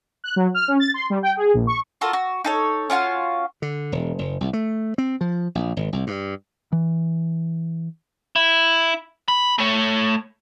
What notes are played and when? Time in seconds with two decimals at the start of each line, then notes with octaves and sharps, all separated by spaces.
0.24 F#6
0.36 F#3
0.54 F6
0.68 C#4
0.80 A6
0.94 C6
1.10 G3
1.23 G5
1.37 G#4
1.54 A#1
1.67 C#6
2.01 F4 F#4 A4 A#4
2.13 F#4
2.44 D#4 A4 C#5
2.90 C#4 F4 F#4 F5
3.62 D3
3.92 E1
4.19 F#1
4.41 C2
4.53 A3
4.98 C4
5.21 F3
5.55 A#1
5.77 G#1
5.93 C2
6.07 G2
6.72 E3
8.36 E4
9.28 B5
9.58 A3 C#5